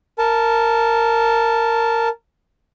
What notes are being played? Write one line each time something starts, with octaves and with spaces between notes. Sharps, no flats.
A#4 A5